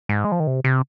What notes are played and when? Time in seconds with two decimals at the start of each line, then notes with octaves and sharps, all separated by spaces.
0.09 G#2
0.25 G#3
0.32 F3
0.40 D#3
0.47 C3
0.64 C3